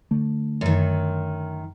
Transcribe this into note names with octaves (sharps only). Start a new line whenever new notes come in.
D3 A3
F#2 D#3